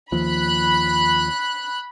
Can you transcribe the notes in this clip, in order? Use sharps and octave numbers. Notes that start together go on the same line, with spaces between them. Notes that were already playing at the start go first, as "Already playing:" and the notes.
D#2 F3 B5 F#6